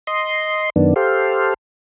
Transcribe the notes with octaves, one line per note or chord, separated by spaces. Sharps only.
D#5 C6
F#2 D#3 B3 D4
G4 A4 C5 F5